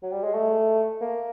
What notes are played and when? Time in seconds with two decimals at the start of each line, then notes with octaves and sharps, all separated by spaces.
0.03 F#3
0.13 G3
0.24 G#3
0.34 A3
1.01 A#3